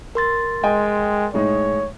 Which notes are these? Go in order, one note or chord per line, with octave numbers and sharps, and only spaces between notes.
A#4 C6 A6
G#3 D#5 G5 G#5
A2 G#3 D#4 C#5